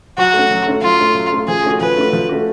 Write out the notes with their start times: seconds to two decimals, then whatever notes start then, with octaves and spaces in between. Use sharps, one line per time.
0.18 F#3 F#4
0.33 A3
0.38 C#4
0.51 F#3
0.66 A3 C#4
0.82 F#3 F4
1.00 A3 C#4
1.15 F#3
1.32 A3 C#4
1.48 F3 G#4
1.63 A3 C#4 F#4
1.80 F3 B4
1.96 A3 C#4 F#4
2.13 F3
2.29 A3 C#4 F#4